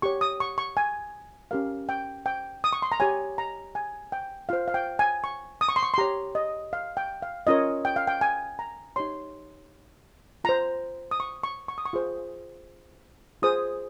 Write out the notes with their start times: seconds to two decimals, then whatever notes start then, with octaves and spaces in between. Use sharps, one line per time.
0.02 G4 C#5 C#6
0.21 D#6
0.40 C#6
0.58 C#6
0.77 G#5
1.51 C#4 G4 A#4 F5
1.89 G5
2.26 G5
2.64 D#6
2.73 C#6
2.82 C6
2.92 A#5
3.00 G4 C#5 G#5
3.38 A#5
3.75 G#5
4.12 G5
4.49 F4 C5 F5
4.68 F5
4.74 G5
4.99 G#5
5.24 C#6
5.61 D#6
5.69 C#6
5.76 C6
5.83 C#6
5.94 C6
5.98 G4 C#5 A#5
6.35 D#5
6.73 F5
6.97 G5
7.22 F5
7.47 C#4 F4 A#4 C#5 D#5
7.85 G5
7.96 F5
8.07 G5
8.21 G#5
8.59 A#5
8.96 D#4 G4 C#5 C6
10.44 F4 C5 A#5
11.11 D#6
11.20 C#6
11.43 C#6
11.68 C#6
11.78 D#6
11.86 C#6
11.93 F4 G#4 C5
13.42 F4 G#4 C5 D#6